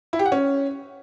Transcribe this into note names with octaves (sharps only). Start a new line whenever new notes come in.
E4
G4
F#5
C#4